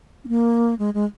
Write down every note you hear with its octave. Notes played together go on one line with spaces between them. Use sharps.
C#4
A#3
G#3
G#3